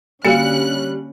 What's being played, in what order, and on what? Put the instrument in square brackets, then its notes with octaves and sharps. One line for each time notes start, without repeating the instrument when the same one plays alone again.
[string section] D3 C#4 F#6 [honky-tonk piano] G3 C#7 [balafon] A#3 F#4 F5